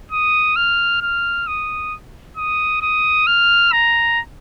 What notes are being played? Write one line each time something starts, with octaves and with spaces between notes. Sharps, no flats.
D#6
F6
F6
D#6
D#6
D#6
F6
A#5